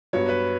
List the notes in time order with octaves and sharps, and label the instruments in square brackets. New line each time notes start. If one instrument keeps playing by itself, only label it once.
[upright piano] G2 F#3 B3 F#4 [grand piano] C#5
[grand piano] B4